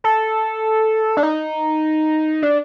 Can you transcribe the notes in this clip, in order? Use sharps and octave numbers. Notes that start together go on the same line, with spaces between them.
A4
D4
D#4
D4